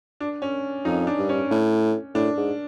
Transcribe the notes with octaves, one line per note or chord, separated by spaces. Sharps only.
D4
C#4
F2 D#4
D4
G2
C#4
A2
A2 D4
G#2